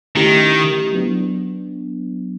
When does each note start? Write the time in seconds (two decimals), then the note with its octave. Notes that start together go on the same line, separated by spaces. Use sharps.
0.16 D#3 A3 C#4 E4 G4
0.93 F#3 B3 D4